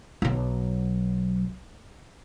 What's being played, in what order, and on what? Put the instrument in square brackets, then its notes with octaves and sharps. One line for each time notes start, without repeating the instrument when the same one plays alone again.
[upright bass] B1 F#3